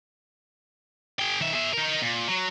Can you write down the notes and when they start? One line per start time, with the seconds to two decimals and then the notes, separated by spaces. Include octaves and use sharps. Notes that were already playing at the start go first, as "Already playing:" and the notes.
1.19 G#4 G5
1.41 D#3 E5
1.53 G#4 E5
1.74 D#4 A#4
2.02 A#2
2.28 F#3